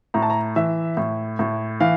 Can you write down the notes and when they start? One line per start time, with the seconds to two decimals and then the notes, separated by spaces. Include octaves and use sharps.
0.14 A2 A#5
0.22 A5
0.30 A#5
0.56 E3 E5
0.97 A2
1.39 A2
1.80 E3 F5